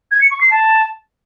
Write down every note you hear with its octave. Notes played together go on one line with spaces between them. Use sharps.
G#6
C#7
C#6
C7
A5